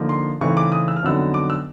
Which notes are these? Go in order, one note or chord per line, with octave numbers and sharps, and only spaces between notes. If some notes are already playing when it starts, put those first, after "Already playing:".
Already playing: D3 F3 A#3 D#4
C6
C#3 E3 A3 C4 D#4 C#6
D6
D#6
E6
F6
F2 D3 F#3 B3 D#4 E6
D6
E6